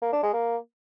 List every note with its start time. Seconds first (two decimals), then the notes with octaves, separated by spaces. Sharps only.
0.02 A#3
0.12 D4
0.23 G#3
0.33 A#3